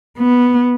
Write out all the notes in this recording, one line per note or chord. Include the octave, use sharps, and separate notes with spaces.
B3